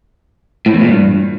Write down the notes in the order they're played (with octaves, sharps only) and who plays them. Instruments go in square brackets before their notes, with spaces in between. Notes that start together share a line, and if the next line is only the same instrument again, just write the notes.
[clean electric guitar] A2
E2
A#2
G2